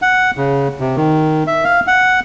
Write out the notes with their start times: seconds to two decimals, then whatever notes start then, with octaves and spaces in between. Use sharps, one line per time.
0.02 F#5
0.37 C#3
0.80 C3
0.96 D#3
1.47 E5
1.64 F5
1.87 F#5